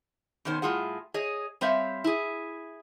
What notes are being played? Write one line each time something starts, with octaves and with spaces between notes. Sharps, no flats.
B2 D#3 C#4 C5
A2 G3 F4 G#4 F#5
G#4 C#5 D#5
G3 C4 C5 C#5 E5 F5
E4 G#4